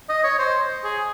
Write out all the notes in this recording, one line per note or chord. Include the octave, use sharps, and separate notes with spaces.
D#5
C#5
C5
G#4